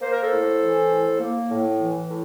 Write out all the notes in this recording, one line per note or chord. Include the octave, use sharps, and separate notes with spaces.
A#3 C5
A#4
A4 C5
A2
E3
A2
A#3
A2
E3
A2